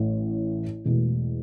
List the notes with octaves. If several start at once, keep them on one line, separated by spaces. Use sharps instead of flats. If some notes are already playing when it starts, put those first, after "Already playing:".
Already playing: A1 A2 E3 A3
E1 E2 B2 A3